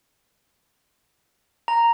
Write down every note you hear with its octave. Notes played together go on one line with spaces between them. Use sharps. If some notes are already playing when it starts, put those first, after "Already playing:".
A#5